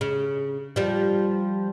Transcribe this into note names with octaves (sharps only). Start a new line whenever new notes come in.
C#3
F3 G3